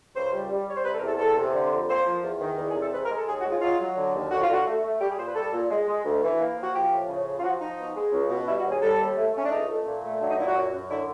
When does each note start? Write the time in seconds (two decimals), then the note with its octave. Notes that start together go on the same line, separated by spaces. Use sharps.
0.15 C#2 C5
0.33 G3
0.50 G3
0.67 G3 C#5
0.77 C5
0.85 C3 B4
0.92 A4
0.96 A#4
1.02 E2
1.08 A4
1.19 E2 A4
1.37 C3
1.54 D3
1.72 F2
1.89 A#3 C5
2.05 F3
2.23 E2
2.40 D#3
2.57 E2
2.69 G#4
2.75 C3
2.81 A4
2.93 G#3 B4
3.04 A#4
3.10 G#3
3.16 A4
3.27 D#2 G#4
3.39 F#4
3.45 G#3
3.50 F4
3.62 F#3 F4
3.79 F#3
3.97 D3
4.14 D#2
4.31 D3 F#4
4.42 F4
4.49 D3 F#4
4.66 A3
4.83 A3
5.00 G3 G4
5.09 G#4
5.18 A#2 C5
5.27 B4
5.35 G3 A4
5.52 A#2
5.70 G#3
5.87 G#3
6.05 D2
6.22 E3
6.39 A#3
6.56 F3
6.63 F#4
6.73 F3 G4
6.91 A2
7.09 C#3
7.26 F3
7.39 F4
7.43 F3 F#4
7.60 F3 D#4
7.78 B2
7.96 G#3
8.12 C#2
8.29 B2
8.47 G3 E4
8.59 F#4
8.65 D#2
8.71 G#4
8.82 G3 A4
8.99 D#2
9.17 A3
9.34 A3 C#4
9.44 D4
9.51 C#2 D#4
9.69 A3
9.86 A#2
10.03 A3
10.21 F#3 D4
10.30 D#4
10.38 A#2 E4
10.47 F#4
10.55 F#2
10.73 F#2
10.90 D3 E4